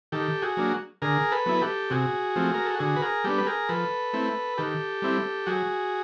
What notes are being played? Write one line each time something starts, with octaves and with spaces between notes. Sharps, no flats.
D#3 G4 A4
F#4 G#4
F#3 A#3 D4
D3 G#4 A#4
A4 B4
F#3 B3 E4
G4 A4
C3 F#4 G#4
F3 A3 C4
A#4
A4
D3 F#4 G#4
B4
G#4 A#4
G3 B3 D4 G4 A4
B4
G#4 A#4
F3 A4 B4
A3 C4 E4
D#3 G4 A4
G3 C4 E4
F#3 F#4 G#4